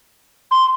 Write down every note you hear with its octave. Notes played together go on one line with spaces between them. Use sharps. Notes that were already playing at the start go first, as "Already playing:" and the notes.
C6